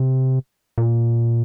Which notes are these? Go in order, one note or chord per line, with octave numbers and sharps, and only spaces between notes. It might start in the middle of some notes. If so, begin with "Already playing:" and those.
Already playing: C3
A#2